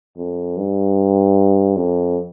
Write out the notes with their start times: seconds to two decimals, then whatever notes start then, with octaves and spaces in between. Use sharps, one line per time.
0.17 F2
0.57 G2
1.76 F2